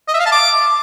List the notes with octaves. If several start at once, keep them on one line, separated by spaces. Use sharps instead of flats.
D#5
E5
F5
A5
D6